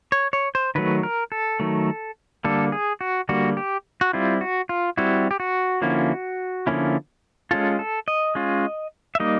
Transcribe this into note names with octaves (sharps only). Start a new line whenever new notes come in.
C#5
C#5
C5
D#3 F#3 A3 B4
A#4
A4
D#3 F#3 A3
D3 G3 A#3 A4
G#4
F#4
D3 G3 A#3 F#4
G4
F#4
G3 C4 E4 F4
F#4
F4
G3 C4 E4 F#4
G4
F#4
D3 F3 A#3 C#4 E4
D3 F3 A#3 C#4 E4
G#3 C#4 F4 A4
A4
D#5
G#3 C#4 F4
E5
G3 A#3 D#4 D#5